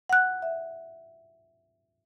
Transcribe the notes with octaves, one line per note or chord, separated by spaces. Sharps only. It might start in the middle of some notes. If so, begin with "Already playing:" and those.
F#5 F#6
E5